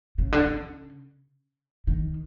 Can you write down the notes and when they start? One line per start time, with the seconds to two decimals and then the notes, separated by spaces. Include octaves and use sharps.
0.18 C#3
0.32 D3
0.46 C#3
1.87 D#3